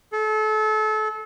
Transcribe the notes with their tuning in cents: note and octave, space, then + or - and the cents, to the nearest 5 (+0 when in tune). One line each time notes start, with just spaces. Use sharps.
A4 -30